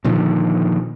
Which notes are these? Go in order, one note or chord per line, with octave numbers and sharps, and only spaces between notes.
A#2 D3 D#3 F3